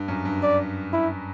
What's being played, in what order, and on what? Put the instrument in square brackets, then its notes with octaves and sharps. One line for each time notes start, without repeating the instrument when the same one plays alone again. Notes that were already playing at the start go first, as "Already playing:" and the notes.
Already playing: [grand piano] G2
F#2
G2
[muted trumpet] D5
E4